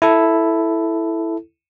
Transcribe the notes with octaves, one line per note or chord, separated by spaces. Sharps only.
E4 A4